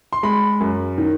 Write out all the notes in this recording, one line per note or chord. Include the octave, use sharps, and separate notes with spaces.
C6
G#3 B5
F#2
D#3